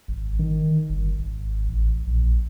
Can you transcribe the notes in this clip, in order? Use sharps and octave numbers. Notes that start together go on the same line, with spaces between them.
G#1
D#3
G1
G#1
A1
A#1